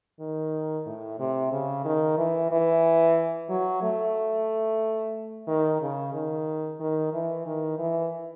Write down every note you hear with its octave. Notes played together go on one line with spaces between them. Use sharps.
D#3
A2
C3
C#3
D#3
E3
E3
F#3
A3
D#3
C#3
D#3
D#3
E3
D#3
E3